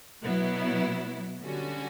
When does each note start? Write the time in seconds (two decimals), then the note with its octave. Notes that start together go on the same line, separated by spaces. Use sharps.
0.23 B2 F#3 B3 E4
1.43 D3 G3 C#4 F#4